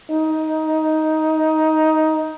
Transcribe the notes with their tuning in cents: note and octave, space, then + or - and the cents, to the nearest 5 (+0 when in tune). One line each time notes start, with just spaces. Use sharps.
D#4 +10